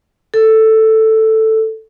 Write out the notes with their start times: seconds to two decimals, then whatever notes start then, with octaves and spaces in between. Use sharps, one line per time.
0.34 A4